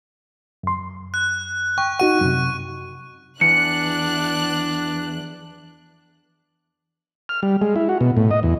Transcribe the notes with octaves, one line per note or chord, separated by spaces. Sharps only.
F#2 C6
F#6
G5 C#6
D#4 F#4 F#5 D#7
F#2 C3
E2 D4 F#6 C#7
F6
G3
G#3
E4
F#4
B2
A2
D#5
E2